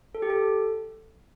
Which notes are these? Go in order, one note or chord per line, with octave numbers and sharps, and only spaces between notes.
A4
G4
A4